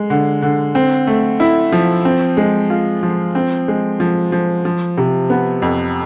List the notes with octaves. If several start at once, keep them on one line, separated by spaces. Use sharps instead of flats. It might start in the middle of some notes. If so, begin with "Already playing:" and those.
Already playing: G#3
D3
D3
C4
A3
E4
F3
C4
G#3
F4
F3
C4
G#3
F3
F3
F3
C3
B3
F2